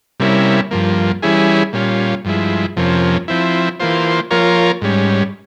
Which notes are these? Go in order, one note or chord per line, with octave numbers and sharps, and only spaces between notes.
C3 G3 A#3 C#4 E4
G2 F3 A#3
E3 G3 C#4 E4 G#4
A#2 G3 C#4 F4
G2 F3 G#3 E4
F2 C3 F3 A#3 C#4
F3 C4 E4
E3 A#3 F4 C5
F3 A#3 F4 A#4 C#5
G#2 G3 C#4